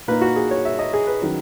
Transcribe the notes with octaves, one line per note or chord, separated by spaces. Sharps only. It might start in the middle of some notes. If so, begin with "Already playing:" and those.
A#2 A#3 D#4 B4
F#4
G#4
C#5
E5
D#5
G#4
B4
D#3 F#3 C#4